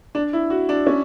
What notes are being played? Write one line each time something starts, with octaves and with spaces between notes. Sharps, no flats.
D4
E4
F#4
D4
C#4